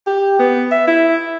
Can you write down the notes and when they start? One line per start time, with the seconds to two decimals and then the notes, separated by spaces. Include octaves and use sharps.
0.07 G4
0.39 B3
0.71 E5
0.87 E4